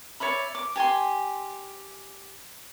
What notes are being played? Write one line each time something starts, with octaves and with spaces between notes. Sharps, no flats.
C#5 D5 E5 B5
D6
G4 G#5 A5 C6